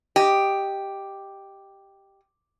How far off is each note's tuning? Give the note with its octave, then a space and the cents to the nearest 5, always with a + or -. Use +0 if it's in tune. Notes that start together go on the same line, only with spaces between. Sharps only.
G4 +0 D#5 +0